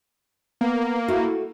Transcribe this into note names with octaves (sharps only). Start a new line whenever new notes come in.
A#3 B3
A3 E4 F#4